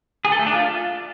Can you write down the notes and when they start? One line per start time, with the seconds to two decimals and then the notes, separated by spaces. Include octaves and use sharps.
0.25 G#4
0.32 A4
0.39 A3
0.47 D4
0.54 F4